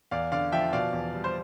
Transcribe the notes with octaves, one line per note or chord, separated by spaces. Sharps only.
E2 D5 F5
D3 D5 F5
F3 E5 G5
B2 D5 F5
E2
G3
C5